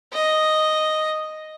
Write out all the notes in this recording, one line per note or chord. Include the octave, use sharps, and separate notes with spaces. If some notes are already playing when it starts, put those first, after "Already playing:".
D#5